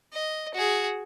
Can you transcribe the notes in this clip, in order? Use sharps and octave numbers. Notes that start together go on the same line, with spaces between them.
D#5
F#4 G#4